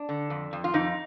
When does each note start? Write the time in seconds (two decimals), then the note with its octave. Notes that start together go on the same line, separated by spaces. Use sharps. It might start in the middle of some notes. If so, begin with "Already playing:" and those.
Already playing: D4
0.09 D3
0.30 F2
0.53 F2
0.64 F4
0.74 F2 D#4